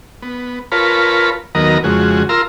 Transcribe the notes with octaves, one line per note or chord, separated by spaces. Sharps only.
B3
F4 A#4 B4 C#5 A5 B5
D#2 F#3 B3 A#4 D#5 A#5
F2 C#3 G#3 F#4
F4 A#4 A#5 C6 E6